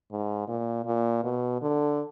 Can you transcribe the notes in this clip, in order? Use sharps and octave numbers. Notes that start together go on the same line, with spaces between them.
G#2
A#2
A#2
B2
D3